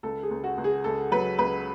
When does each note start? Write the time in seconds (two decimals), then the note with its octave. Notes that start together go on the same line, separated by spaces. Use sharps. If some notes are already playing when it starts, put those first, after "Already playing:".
0.03 C#2 A4
0.23 G#4
0.31 C#2
0.44 F#4
0.58 C#2
0.64 G#4
0.84 C#2 A4
1.11 F#3 B4
1.38 C#2 B4